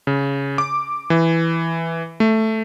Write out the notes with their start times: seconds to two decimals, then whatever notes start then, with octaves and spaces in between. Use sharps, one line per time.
0.07 C#3
0.58 D6
1.10 E3
2.20 A3